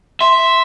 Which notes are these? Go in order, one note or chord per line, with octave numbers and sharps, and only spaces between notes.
E5 C6